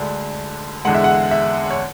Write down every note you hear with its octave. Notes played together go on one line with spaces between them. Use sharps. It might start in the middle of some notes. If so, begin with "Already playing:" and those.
Already playing: D2 D3 G#3 D4
E2 D3 G#3 F#5
E5
F#5
E5
C#5